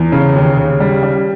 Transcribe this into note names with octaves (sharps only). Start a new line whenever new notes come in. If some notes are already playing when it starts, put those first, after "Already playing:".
Already playing: E2
C#3
D#2
C#3
G3
G3